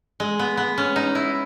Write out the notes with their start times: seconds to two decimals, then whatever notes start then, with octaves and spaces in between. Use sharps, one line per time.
0.20 G#3
0.39 B3
0.57 B3
0.78 C#4
0.96 D#4
1.15 E4